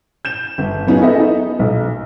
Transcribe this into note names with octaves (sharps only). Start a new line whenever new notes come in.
G6 E7
G1
F#3 B3 C#4 D#4 F4 G#4
B3 A4 D#5 E5
D#4
B1